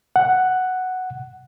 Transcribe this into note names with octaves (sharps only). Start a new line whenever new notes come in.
F#5